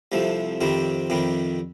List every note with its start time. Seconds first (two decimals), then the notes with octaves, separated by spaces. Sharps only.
0.12 C2 C3 F3 A3
0.61 F2 C3 D#3 G3 C4
1.10 F2 C3 D#3 G3